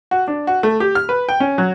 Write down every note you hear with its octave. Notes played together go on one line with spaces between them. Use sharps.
F#4
D4
F#4
A3
G4
F6
B4
G5
C#4
F#3